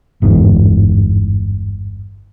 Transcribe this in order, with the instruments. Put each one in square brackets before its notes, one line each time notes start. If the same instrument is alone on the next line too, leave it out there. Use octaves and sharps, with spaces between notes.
[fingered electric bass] G1 E2 G#2